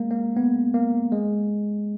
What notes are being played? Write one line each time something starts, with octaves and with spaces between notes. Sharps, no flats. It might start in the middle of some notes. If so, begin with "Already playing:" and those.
Already playing: G#3 A#3
A#3
B3
A#3
G#3